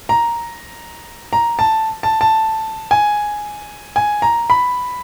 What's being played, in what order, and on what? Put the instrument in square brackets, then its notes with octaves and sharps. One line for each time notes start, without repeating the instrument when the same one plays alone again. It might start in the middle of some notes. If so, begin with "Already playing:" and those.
[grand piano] A#5
A#5
A5
A5
A5
G#5
G#5
A#5
B5